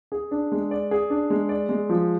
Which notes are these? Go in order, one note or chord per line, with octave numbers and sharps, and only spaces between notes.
G#4
D4
G#3
D5
G#4
D4
G#3
D5
G#3
F3